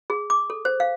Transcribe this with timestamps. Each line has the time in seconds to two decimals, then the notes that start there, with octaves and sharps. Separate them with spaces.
0.10 G#4
0.30 D6
0.50 A4
0.65 C5
0.80 F5